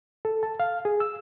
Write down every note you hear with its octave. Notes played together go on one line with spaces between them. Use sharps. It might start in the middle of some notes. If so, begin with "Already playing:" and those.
A4
A5
F5
G#4
E6